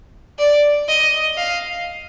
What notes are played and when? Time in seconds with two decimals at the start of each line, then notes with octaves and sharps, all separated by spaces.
0.39 D5
0.89 D#5
1.38 F5